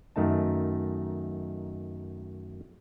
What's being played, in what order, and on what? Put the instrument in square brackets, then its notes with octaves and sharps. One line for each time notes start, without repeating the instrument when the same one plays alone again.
[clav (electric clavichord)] F#2 D#3 A3 D#4 A5